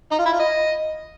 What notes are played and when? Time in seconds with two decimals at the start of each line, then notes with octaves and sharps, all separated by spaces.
0.11 D#4
0.19 F4
0.26 E4
0.33 F4
0.40 D#5